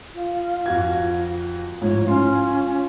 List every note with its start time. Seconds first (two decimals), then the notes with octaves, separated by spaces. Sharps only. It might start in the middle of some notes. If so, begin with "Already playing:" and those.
0.14 F4
0.66 F2 F#4 G#6
1.82 A1 G#2 F3 C#5
2.08 C#4 F4 C6